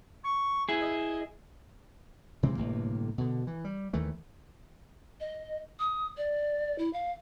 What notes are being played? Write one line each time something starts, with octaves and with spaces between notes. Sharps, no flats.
C#6
E4 G#4
D#5
C3 E3 G#3 C4
G1 A2 C3 A#3
B2 D3
E3
G3
D#2 D#3 E3 A3
D#5
D#6
D5
E4
F5